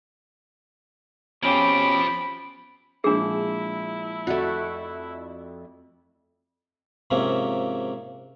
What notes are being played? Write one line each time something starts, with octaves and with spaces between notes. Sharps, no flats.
B2 F3 C4 C#4 G4 B5 D7
A#2 F3 G#3 D4 E4 G#4
F2 A3 F#4 D5 E5
G#2 C3 F3 A#3 C4 C#4